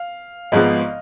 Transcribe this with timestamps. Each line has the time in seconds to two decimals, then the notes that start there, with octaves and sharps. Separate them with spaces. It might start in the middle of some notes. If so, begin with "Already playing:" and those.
Already playing: F5
0.52 G#1 G#2 F3 G#3 B3 D#5